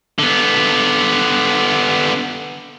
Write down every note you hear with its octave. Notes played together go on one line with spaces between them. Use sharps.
D3 B3